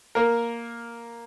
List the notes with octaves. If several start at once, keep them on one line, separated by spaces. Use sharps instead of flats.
A#3 A#4